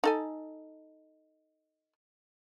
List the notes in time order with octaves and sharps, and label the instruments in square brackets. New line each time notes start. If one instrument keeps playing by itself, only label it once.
[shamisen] D#4 A4 G#5